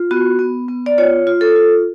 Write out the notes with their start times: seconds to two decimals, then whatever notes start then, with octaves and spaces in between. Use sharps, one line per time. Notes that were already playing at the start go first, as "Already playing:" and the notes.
Already playing: F4
0.11 B3 F#4
0.39 B3
0.69 B3
0.86 D5
0.98 F4 C#5
1.27 F4
1.41 A4
1.55 F4